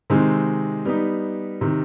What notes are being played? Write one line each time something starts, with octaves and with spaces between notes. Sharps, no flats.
C3 D#3 G#3 C4
G3 B3 D#4
C3 D#3